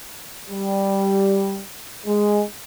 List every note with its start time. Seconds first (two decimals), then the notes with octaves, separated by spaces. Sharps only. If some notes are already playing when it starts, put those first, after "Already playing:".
0.50 G3
2.06 G#3